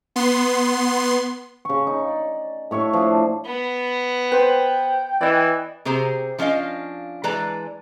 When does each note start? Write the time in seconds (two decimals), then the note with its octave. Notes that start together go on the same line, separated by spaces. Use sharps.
0.16 B3 C6
1.65 C#3 C#6
1.87 D#4
2.08 D5
2.71 A2 C#5 E5 C#6
2.93 F3 D4
3.46 B3
4.32 B4 C5 G5
5.21 E3 D5 D#5
5.85 C3 G4 G#4 C5 A#5
6.38 F3 C#4 D4 D#5 F5
7.24 E3 G#3 B4 D5 A5 A#5